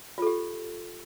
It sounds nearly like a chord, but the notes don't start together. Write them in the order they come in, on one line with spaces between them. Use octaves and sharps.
F4 A4 G4